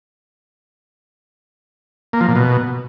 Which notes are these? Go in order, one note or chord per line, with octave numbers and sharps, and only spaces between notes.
A#3
F3
A#2
B2